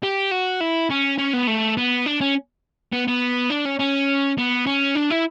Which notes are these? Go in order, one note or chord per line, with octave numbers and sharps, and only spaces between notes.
G4
F#4
E4
C#4
C#4
B3
A3
B3
D4
C#4
B3
B3
D4
C#4
C#4
B3
C#4
D4
E4